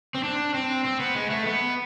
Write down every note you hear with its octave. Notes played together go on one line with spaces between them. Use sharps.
C4
D4
C4
C4
B3
G#3
A3
B3